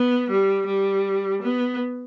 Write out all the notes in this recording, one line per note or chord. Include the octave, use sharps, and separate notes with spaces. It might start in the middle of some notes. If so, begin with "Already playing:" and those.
Already playing: B3
G3
G3
B3